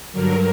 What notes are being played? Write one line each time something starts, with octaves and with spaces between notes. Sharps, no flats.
G2 D3 F#3 A#4